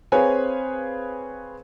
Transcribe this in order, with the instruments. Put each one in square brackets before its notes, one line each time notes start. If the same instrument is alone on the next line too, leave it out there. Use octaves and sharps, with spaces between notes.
[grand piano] C4 G#4 B4 C#5 F5 G#5